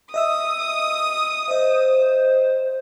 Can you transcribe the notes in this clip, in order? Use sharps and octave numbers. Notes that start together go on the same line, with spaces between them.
D#5 E5 D#6 E6
C5 D#5 E5